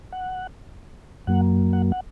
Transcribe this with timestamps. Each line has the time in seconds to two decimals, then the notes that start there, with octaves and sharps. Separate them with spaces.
0.12 F#5
1.27 F#2 F#3 A#3 F#5
1.73 F#5
1.92 F#5